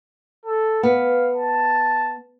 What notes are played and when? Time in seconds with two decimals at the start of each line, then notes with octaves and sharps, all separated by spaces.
0.46 A4
0.83 B3 F5
1.34 A5